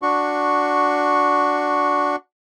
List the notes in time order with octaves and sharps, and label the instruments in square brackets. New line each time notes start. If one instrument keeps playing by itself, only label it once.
[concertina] D4 F#4 C#6